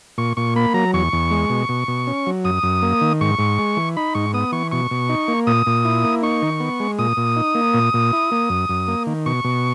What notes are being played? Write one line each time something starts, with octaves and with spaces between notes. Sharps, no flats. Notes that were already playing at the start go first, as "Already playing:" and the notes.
A#2 C#6
A#2 C#6
A#3 B5
F#3 A#5
E2 C#6
E2
G#3
B2
B2
B2
C#4
F#3
F#2 D#6
F#2
A#3
D#3
G#2 C#6
G#2
G#3
E3
D#4 B5
G#2 C#6
B3 D#6
E3 C#6
B2 C#6
B2
D#4
A#3
A#2 D#6
A#2
E4
A#3
D#4 C#6
D#3
B3
G#3
A#2 D#6
A#2
D#4
A#3
A#2
A#2
E4
A#3
F#2
F#2
A#3
D#3
B2 C#6
B2